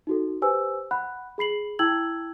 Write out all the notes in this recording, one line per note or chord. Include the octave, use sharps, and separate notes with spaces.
D#4 F#4 A4
G4 B4 C5 G#5 E6
F#5 B5 F#6
G#4 B5 C7 F#7
E4 G5 A5 E6 G#6 F#7